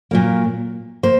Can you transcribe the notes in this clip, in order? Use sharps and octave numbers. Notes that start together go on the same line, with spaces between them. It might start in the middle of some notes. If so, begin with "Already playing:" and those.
A#2 F#3 A#3
A#3 C5